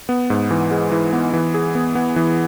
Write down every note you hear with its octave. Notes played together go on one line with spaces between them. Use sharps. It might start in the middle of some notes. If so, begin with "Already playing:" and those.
B3
G#2
E3
G#3
E3
B3
E3
G#4
B3
B3
E3